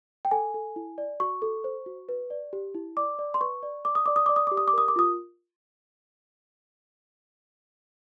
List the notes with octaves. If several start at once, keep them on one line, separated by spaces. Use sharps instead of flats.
G5
A4 G#5
A4
E4
D5
F#4 C#6
A4
C5
F#4
B4
D5
G4
E4
D5 D6
D5
C6
B4 C#6
D5
D5 D6
D#6
D5 D6
D#6
D5 D6
D#6
G4 D6
D#6
D6
A#4 D#6
D6
F4 D#6